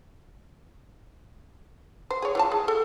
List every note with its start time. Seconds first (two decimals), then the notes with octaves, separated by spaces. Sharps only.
2.10 C5
2.22 G#4 C#5
2.35 E3 F3 A5
2.52 G#4
2.68 A4